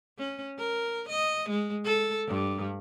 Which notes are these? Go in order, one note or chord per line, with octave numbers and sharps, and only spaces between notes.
C#4
A#4
D#5
G#3
A4
G2